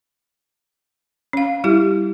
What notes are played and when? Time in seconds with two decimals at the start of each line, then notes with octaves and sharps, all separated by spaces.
1.33 C#4 F5
1.64 G3 E4 G4